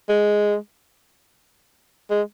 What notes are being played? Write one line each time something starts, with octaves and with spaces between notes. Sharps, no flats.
G#3
G#3